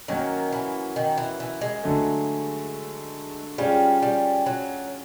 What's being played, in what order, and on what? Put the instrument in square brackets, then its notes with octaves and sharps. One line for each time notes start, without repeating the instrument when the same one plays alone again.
[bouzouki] D#3 [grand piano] F#3 A#3 C#4 F#4
[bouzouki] E3
D#3
E3
E3
G#3
[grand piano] D3 F#3 A3
[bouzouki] G3 [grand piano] G#3 C#4 F4
[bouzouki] G3
F#3